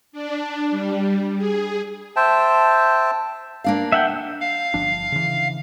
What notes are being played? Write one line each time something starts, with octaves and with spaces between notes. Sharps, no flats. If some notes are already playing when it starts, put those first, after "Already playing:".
D4
G3
G#4
C5 E5 G5 A5
A#3 D4 F5
E5 F#5 G5
F5
G1 F3 D4
C#3 E3